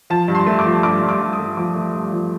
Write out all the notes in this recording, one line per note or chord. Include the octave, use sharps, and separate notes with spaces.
F3 A5
G2
C6
A3
D6
F3
G2 D6
G2
D6
G2
D#6
A3
F3 D6
A3
G2
F3